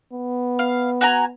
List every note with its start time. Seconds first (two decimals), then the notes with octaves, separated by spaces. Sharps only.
0.13 B3
0.59 F5
1.01 F#4 G#5 A#5